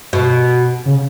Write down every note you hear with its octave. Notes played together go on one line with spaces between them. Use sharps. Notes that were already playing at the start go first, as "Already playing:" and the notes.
B2
C#3